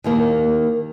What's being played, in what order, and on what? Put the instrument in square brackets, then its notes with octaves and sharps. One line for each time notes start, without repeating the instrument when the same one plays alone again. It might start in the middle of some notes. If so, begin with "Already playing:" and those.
[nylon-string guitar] D#2 D#3 A#3